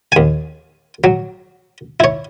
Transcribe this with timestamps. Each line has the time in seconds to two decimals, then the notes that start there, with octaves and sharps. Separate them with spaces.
0.12 D#2 G#5
1.04 F#3
2.00 E4 C#5